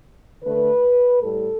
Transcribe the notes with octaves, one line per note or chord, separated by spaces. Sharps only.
D3 A3 B4
A2 G3 A4